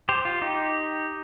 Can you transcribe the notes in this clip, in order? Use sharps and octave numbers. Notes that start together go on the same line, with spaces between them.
G4 C5
F4
D#4 G4